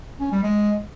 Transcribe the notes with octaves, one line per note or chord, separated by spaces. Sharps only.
C#4
G3
G#3